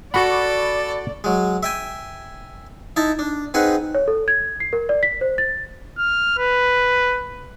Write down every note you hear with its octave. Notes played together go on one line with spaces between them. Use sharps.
F#4 A4 D5 F#5 B5 C#6 D6
F#3 G#3
E5 G5 G#5
D#4 E4 A5
D4
C4 D#4 G#4 B4 F#5
C#5
A4
G#6
C7
A#4
D5
B6
C5
A6
F6
B4